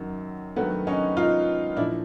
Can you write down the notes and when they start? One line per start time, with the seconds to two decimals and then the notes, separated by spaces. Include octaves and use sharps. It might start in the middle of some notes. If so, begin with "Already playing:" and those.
Already playing: F#2 D#3 F#3
0.56 G2 D#3 F#3 A3 B3
0.87 C#4 D#4
1.17 D#4 F4
1.77 A#2 F3 D4 E4